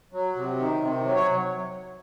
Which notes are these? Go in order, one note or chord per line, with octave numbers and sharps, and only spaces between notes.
F#3
C3
D#3
C3
F#3
C#5